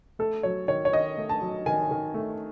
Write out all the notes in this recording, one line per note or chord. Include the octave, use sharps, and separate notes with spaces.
A3 A4
F#3 C#5
D#3 C#5
C#5
D#3 D#5
A3
A5
F#3
D#3 G#5
D#3
A3